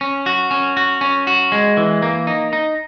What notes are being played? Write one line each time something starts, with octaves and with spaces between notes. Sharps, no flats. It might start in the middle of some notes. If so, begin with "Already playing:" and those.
C#4
F#4
C#4
F#4
C#4
F#4
G#3
E3
A#3
D#4
D#4